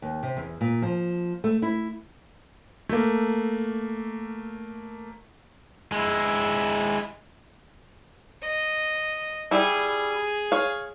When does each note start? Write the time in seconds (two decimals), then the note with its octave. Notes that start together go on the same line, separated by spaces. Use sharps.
0.02 D#2
0.23 C3
0.37 E2
0.61 A#2
0.82 F3
1.44 A3
1.62 E4
2.89 A3 A#3
5.92 G#3 E4
8.42 D#5
9.51 G3 E4 G#4
10.52 C#5 F5